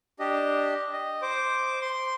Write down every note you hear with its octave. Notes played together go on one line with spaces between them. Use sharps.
D4 G4 D#5
D#5
C5 D6
C6